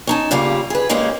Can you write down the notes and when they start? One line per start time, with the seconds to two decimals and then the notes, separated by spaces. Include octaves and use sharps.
0.07 C#4 D#4 A5
0.31 G2 C#3 G3 A#3 F4
0.70 G#4 B4
0.89 G2 D#3 G#3 A#3 C#4 D#4